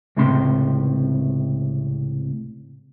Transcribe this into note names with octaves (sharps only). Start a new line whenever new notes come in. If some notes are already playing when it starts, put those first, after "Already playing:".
C#2 A2 C3 C4 C6